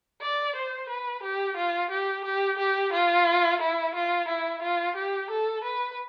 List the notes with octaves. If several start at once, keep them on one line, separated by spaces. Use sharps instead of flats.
D5
C5
B4
G4
F4
G4
G4
G4
F4
E4
F4
E4
F4
G4
A4
B4